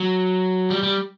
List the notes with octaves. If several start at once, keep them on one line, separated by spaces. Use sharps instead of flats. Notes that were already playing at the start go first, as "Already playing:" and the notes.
Already playing: F#3
G3
G3